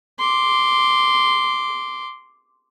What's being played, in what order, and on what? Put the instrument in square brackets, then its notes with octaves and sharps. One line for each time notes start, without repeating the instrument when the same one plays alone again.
[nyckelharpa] C6 D6